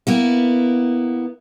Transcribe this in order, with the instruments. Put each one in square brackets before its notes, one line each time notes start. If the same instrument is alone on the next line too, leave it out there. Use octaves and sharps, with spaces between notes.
[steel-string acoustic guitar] A#3 B3 E4